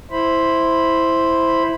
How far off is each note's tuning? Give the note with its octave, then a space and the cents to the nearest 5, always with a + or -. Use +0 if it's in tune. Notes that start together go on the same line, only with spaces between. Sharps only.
E4 +0 C5 +0 B5 +0